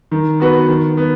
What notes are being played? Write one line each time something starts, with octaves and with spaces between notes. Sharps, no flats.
D#3
B3 F#4 B4
D#3
B3